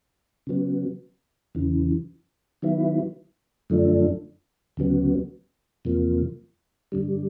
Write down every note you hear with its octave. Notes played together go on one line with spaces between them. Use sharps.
C#3 F#3 B3
E2 C#3 E3
D#3 F#3 B3 E4
F#2 D3 F3 A3 D4
D2 C#3 F#3 B3
E2 C3 F3 A#3
G2 D3 G3